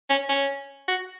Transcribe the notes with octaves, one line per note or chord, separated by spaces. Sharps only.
C#4
C#4
F#4